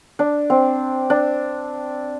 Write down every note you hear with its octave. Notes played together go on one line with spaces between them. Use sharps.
D4
C4
D4